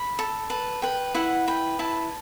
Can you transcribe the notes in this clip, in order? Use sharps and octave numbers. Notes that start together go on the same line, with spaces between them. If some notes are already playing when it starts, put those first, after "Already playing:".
Already playing: B5
A4
B4 A5
B4 G5
E4 F#5
B4 G5
E4 A5